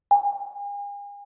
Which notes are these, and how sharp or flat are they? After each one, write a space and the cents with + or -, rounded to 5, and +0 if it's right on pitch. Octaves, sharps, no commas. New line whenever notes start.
G#5 -45